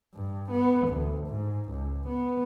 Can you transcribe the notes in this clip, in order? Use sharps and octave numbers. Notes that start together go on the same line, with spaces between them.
G2
B3
D2
G#2
C#2
B3